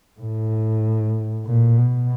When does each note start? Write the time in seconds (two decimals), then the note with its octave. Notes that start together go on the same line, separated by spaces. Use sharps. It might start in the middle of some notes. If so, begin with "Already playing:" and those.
0.20 A2
1.46 A#2
1.77 B2